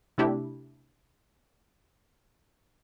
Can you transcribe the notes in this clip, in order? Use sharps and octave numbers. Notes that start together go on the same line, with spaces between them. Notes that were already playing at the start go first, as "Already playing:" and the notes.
C3 A3 D4 E4 G4